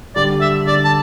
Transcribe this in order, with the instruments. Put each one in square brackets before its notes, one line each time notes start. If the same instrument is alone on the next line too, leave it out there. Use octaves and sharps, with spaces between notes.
[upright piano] D3 G3 [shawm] D5
[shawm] E5
[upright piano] D3 [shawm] D5
[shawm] A5